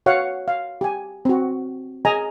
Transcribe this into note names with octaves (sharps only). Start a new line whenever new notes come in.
F#4 C#5 F5 F#5
F5
G4 G#5
C4 F#4
G#4 D#5 G#5 A#5